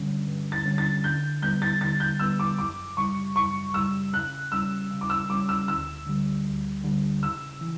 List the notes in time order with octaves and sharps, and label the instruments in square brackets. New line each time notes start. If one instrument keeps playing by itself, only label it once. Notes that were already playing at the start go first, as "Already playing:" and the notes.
Already playing: [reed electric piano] G2 D3 G3 C#4
G2
[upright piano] A6
[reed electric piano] D3 G3 C#4
[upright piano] A6
[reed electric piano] D3 [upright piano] G6
[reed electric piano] G3 B3 [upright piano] G6
[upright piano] A6
[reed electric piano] D3 [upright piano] A6
[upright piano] G6
[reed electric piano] G3 B3 [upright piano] E6
[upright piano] D6
[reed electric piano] F#2 [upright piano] D6
[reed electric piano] C#3 G3 [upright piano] C#6
[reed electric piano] F#2 [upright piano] C#6
[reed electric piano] C#3 G3 [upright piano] E6
[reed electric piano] C#3 [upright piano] F#6
[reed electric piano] G3 C#4 [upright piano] E6
[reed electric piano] C#3
[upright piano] D6
E6
[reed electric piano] G3 C#4 [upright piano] D6
[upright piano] E6
[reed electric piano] D2 [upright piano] E6
[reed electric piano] D3 G3
D2
D3 G3
[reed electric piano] C#3 [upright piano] E6
[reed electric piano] E3